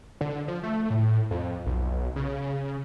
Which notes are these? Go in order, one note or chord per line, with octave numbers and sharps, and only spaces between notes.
D3
F3
A3
A2
F2
B1
C#3